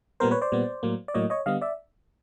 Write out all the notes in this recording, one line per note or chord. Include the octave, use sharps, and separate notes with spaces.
A#2 G3 B3 A#4 C5
B4 C#5
C5 D5
A#2 G3 B3
A2 F#3 A#3
D5
A2 F#3 A#3 C#5 D#5
C#5 D#5
D3 G3 B3 D#5 F5
D5 E5